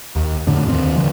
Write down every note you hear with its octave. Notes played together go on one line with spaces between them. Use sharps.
D#2
F2 A2 D3
D#2 C4
D3 F3